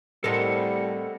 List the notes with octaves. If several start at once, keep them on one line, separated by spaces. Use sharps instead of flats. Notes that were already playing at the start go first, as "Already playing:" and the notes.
A2 G3 C4 A4 A#4 D#5 F#5